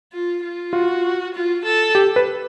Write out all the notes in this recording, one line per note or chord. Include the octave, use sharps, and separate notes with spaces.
F4
F4
F4 F#4
F4
A4
G4
B4